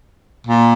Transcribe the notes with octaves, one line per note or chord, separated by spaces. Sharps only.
A#2